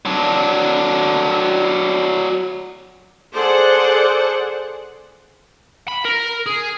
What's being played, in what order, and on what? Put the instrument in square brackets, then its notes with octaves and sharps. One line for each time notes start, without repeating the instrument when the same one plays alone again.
[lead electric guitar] F#3 D4
[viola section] G#4 A4 C5 D5 F#5
[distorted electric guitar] B5
A#4
G#4